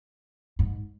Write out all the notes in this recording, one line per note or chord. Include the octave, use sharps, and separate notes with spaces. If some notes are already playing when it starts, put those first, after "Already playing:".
G#2